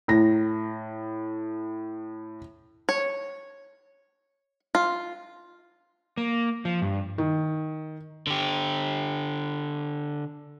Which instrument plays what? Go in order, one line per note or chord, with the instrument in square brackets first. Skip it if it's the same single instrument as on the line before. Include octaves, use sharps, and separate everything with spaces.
[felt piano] A2 A#6
[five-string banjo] C#5
F4
[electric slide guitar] A#3
F3
G2
[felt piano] D#3
[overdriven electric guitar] D3 G4